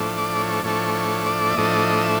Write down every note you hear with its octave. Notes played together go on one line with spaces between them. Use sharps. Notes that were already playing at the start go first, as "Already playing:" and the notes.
Already playing: A2 F3 A3 D4
D5
C#5
A2 F3 A3 D4 C#5
C#5
D5
E5
A2 F3 A3 D4 D#5
E5